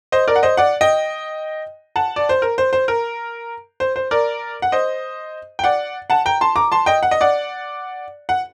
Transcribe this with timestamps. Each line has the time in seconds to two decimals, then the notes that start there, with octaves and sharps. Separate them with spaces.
0.12 C5 D#5
0.28 A#4 D5
0.36 F#5
0.43 C5 D#5
0.57 D5 F#5
0.81 D#5 G5
1.96 F#5 A5
2.16 D5
2.29 C5
2.42 A#4
2.58 C5
2.73 C5
2.88 A#4
3.80 C5
3.96 C5
4.11 A#4 D5
4.62 F#5
4.72 C5 D#5
5.59 G5
5.64 D5 F#5
6.10 F#5 A5
6.26 G5 A#5
6.41 A5 C6
6.56 A#5 D6
6.72 A5 C6
6.86 D#5 G5
7.03 F#5
7.11 D#5
7.21 D5 F#5
8.29 F#5